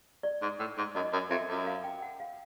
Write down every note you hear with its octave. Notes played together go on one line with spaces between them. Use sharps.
D5
G#2
A2
G#2
F#2 D#5
F#2
F2 E5
F#2
F5
G5
F#5
F5